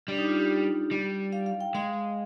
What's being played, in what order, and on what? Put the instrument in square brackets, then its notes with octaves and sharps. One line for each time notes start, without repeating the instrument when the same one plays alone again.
[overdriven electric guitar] G3 [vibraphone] D4
[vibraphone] D#4
F4
G4
[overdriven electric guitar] G3
[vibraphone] F5
F5
G5
[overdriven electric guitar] G#3 [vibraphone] F5